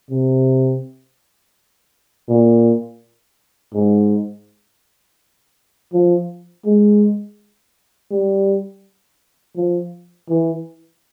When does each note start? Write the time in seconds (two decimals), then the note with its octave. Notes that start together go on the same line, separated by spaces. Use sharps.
0.10 C3
2.29 A#2
3.74 G#2
5.93 F3
6.66 G#3
8.11 G3
9.56 F3
10.29 E3